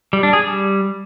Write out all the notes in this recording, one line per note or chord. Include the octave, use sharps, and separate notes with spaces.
G3
D4
G#4
G3